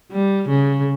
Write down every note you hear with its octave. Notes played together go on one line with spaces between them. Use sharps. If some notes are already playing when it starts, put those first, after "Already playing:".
G3
C#3